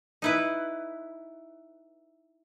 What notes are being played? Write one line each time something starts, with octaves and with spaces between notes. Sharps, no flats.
D#4 E4 B4